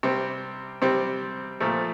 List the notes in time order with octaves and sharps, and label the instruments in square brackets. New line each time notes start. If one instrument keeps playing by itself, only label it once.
[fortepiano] C3 G3 C4
C3 G3 C4
A#2 F3 A3